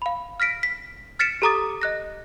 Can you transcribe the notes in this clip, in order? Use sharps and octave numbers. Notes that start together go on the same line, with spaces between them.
F5 B5
F6 A#6 B6 D7
B6
F6 A6 B6 C#7 D7 E7
G4 A4 A#5 D6 D#6 A6
D#5 F#6 A#6